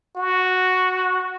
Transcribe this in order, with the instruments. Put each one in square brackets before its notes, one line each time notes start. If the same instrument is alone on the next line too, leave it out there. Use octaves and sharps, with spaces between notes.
[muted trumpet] F#4